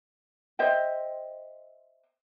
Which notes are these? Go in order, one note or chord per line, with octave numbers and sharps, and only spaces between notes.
C5 D#5 E5 G5